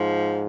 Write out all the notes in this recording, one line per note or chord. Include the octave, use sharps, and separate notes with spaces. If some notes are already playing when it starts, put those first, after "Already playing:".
Already playing: G#2 F3